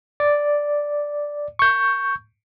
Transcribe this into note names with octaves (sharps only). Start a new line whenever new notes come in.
D5
C#6 G6